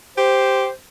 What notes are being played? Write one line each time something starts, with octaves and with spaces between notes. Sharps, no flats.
G4 C5